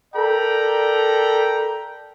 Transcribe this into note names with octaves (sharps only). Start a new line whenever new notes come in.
A4 A#4 D5 G5 A#5 B5